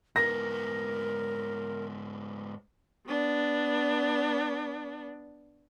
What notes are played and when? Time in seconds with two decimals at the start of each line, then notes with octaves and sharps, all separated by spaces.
0.16 G#2 B3 A#4 A#6
3.07 B3 D4